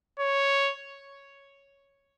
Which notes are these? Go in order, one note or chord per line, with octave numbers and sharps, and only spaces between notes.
C#5